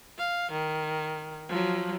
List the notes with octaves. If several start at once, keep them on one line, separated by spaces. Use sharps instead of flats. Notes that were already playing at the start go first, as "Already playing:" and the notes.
F5
D#3
F3 F#3